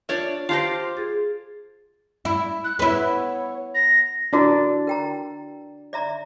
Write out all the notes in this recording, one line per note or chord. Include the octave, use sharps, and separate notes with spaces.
D4 F4 C#5 D5
F4 G4 C5 A5 A#6
G#4 A6
E4
F#6
B3 E4 C#5
A#6
D4 E4 F#4 A#4 D5
A#4 G5 A#5
D5 E5 A#5